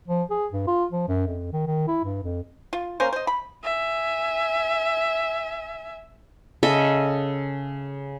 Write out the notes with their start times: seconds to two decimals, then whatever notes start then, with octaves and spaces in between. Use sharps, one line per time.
0.08 F3
0.31 G#4
0.53 G2
0.67 F4
0.92 F3
1.08 F#2
1.27 F2
1.53 D#3
1.67 D#3
1.88 E4
2.04 G2
2.24 F2
2.73 F4
3.00 A#3 C#4 A#4 C5
3.13 C5 D#5
3.27 B5
3.64 E5 G#5
6.63 C#3 A4 D#5 E5